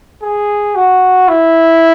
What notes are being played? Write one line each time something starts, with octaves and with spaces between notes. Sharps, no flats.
G#4
F#4
E4